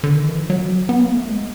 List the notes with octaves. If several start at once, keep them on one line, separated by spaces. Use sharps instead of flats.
D3
D#3
E3
F3
F#3
B3
A#3
A3
G#3